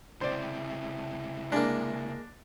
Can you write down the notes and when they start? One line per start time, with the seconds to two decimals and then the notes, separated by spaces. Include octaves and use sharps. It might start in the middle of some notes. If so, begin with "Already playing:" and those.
0.21 C#2 C3 E4 C5 D5
1.52 G#3 A#3 D4